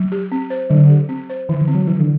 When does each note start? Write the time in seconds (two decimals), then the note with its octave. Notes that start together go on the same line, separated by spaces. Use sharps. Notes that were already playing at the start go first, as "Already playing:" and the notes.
Already playing: F#3
0.12 G4
0.32 C4
0.50 C5
0.70 D3 F#3
0.90 G4
1.09 C4
1.30 C5
1.49 D3 E3
1.61 E3
1.67 C4
1.74 F#3
1.87 E3 F#3
1.99 D3